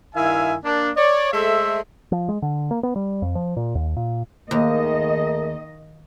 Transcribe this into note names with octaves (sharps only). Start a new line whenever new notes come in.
G2 D#3 E4 E5 F5 G#5
A#3 D4
C#5 D5
G#3 A3 A4 C5 E5
F3
G#3
D3
A#3
B3
G3
F2
F3
A#2
D#2
A#2
D#2 D#3 A3 G#4 A#4 D#5